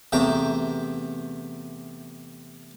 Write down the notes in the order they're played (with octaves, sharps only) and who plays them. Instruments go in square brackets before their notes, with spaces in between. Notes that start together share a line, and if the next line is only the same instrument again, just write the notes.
[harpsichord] E2 C3 A3 G5 A#5